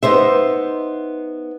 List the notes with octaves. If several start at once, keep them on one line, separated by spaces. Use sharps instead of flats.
B3 D#4 C5 E5